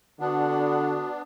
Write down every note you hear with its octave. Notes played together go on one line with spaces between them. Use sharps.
D3 B3 D4 F#4 F#5